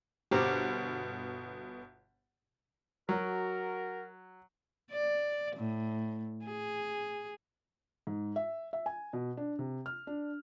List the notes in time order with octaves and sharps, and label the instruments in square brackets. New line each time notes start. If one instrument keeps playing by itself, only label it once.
[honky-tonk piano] G1 B2 [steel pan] G4 C5 A#5
[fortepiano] F#3 [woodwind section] F#4 A#4
[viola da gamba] D5
A2
G#4
[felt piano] G#2
E5
E5
G#5
B2
D4
C3
F6
D4